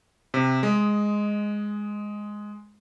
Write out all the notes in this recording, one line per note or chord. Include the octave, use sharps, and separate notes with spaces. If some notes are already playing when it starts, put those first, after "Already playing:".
C3
G#3